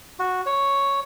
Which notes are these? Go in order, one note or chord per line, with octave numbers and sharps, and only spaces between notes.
F#4
C#5